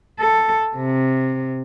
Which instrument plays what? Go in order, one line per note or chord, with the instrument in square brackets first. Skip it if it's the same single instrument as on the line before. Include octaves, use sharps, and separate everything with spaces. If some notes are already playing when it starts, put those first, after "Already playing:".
[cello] A4
C3